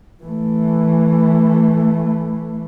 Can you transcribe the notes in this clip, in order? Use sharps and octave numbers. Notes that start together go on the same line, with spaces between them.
E3 A3